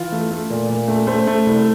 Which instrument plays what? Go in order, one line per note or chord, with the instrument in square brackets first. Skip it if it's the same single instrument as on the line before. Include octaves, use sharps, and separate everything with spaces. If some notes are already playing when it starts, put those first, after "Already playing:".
Already playing: [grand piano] E3 F4
A3
A3
A#2
A#2
A3
A3 C5
A3
C2